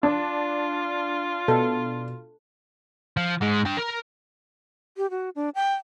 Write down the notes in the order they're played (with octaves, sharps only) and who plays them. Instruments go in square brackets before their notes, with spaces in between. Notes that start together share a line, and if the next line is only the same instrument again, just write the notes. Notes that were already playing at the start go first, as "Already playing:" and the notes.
[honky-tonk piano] D4 [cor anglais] F4
[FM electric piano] B2 [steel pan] A4
[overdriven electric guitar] F3
G#2 G#3
D4 G5
A#4
[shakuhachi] G4
F#4
D4
G5